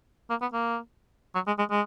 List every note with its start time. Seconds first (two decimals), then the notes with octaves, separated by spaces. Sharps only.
0.30 A#3
0.42 B3
0.53 A#3
1.35 F#3
1.47 G#3
1.59 G#3
1.71 G#3